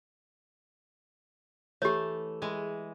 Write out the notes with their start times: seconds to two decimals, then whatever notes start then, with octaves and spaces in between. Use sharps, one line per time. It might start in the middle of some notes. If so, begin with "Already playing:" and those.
1.82 E3 A3 G4 C#5
2.42 E3 G#3